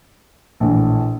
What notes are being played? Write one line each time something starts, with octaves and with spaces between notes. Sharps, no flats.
A#1 A2 E3